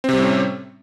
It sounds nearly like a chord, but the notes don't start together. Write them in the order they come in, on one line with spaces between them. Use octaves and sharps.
C4 C3 G3 A2 C#4